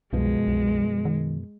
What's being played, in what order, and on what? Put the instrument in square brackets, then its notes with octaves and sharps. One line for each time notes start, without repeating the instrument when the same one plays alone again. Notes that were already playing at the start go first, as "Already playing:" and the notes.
[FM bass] C2 [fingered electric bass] F#2 B2 F3 [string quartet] G#3
[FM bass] C2
D#3